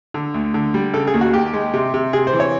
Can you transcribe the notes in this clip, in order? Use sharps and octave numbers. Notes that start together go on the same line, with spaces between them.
D3
D2
D3
G3
C#3 A4
G#4
D#2
F#4
D#2 G4
G#3
C3
C3
C3 G#4
C5
E3
C#5